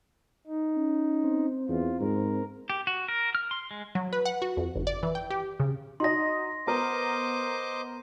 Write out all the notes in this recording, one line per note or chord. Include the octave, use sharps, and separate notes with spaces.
D#4
C#4
C4
E2 F4
G#2 A#4
G4
F#4
A#4
F6
C6
G#3
F#3
B4
F#5
F#4
F2
G1
D5
E3
G5
G4
C#3
D#4 F#4 D#5 C6 A#6
B3 A#4 C5 D#5 D6